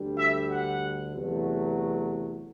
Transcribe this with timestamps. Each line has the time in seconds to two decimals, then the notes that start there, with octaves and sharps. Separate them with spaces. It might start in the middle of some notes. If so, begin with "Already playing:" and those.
Already playing: D2 D3 G3
0.18 E5
0.49 F#5
1.13 E2 C3 F#3 A3